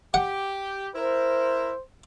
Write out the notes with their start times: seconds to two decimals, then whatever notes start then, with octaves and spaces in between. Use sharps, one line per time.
0.14 G4 F#5
0.95 E4 A#4 C5